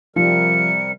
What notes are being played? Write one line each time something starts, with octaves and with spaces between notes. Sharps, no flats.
C3 F3 G3 A#4 C#7